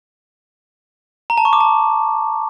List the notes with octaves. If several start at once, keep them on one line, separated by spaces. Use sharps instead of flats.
A#5
A5
C#6
D6
A5